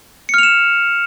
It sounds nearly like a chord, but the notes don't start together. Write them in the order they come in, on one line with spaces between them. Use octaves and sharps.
C#7 F6 F7 E7